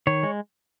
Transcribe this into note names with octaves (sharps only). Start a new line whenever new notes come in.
D#3 C#5
G#3